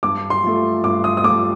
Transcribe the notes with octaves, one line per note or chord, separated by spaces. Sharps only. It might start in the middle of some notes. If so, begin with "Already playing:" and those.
G2 D6
C6
F3 A3
G2 D6
D#6
D#6
F3 A3 D6